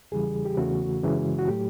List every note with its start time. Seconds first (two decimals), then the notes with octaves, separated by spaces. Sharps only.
0.12 E2 C#3 E3 G3 G#4
0.45 G4
0.57 E2 C#3 E3 A3 F#4
1.03 F#2 C#3 E3 G#3
1.39 F#4
1.48 A2 F#3 A3 G4